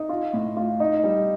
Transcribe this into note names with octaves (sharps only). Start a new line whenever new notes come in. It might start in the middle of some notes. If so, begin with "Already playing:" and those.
Already playing: D#4 D#5
F4
A2
F4
D#4
G3